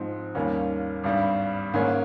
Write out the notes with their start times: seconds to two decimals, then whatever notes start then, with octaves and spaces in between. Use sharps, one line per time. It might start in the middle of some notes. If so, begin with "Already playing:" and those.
Already playing: G#2 F3 C4 D#4
0.35 D#2 D#3 G3 A#3 C#4
1.04 G#1 G2 G3
1.74 G#2 D#3 A#3 C#4